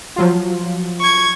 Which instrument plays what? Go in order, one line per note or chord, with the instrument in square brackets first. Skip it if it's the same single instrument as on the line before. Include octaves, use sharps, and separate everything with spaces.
[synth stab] F3 F#3 F4
[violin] C#6 G#6